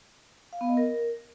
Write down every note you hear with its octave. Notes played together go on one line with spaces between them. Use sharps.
F5
B3
D#5
A#4